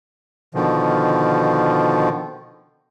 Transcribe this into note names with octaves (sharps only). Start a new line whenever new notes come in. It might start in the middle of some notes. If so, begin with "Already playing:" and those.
B2 D3 D#3 F3